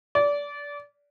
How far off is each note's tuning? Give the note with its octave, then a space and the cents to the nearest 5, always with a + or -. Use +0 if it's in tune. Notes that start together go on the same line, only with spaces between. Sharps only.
D5 -25